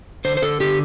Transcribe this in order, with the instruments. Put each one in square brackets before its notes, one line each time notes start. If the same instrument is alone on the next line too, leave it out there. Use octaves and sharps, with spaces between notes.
[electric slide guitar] D3 C5
C5
D3 A4
D3 G4